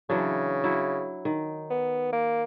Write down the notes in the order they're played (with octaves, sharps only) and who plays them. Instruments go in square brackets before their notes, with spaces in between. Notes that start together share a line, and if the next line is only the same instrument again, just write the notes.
[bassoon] C#3 [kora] E3 F#3 D4
[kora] F#3 E4
D#3
[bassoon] B3
A#3